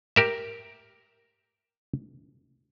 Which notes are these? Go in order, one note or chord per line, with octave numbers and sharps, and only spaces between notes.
G4 A#4 E5